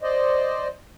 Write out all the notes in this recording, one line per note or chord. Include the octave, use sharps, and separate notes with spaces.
C5 D5 D#5